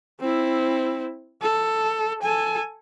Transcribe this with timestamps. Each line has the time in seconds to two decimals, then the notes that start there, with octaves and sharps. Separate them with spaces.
0.21 C4 E4
1.42 A4
2.23 A4 G#5